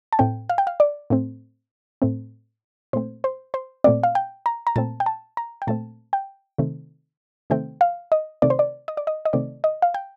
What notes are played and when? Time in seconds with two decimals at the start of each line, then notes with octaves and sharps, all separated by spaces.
0.13 A5
0.19 A2 A3 C4 G5
0.50 F5
0.58 G5
0.67 F5
0.80 D5
1.10 A2 A3 C4
2.02 A2 A3 C4
2.93 A#2 A3 C4 C5
3.24 C5
3.54 C5
3.84 A#2 A3 C4 D5
4.03 F5
4.15 G5
4.46 A#5
4.67 A#5
4.76 A#2 A3 C4 A5
5.00 G5
5.06 A5
5.37 A#5
5.62 G5
5.67 A#2 A3 C4 A5
6.13 G5
6.58 C3 D#3 A3 C4
7.50 C3 D#3 A3 C4 G5
7.81 F5
8.12 D#5
8.42 C3 D#3 A3 C4 D5
8.50 C5
8.59 D5
8.88 D#5
8.97 D5
9.07 D#5
9.25 D#5
9.33 C3 D#3 A3 C4 D5
9.64 D#5
9.82 F5
9.94 G5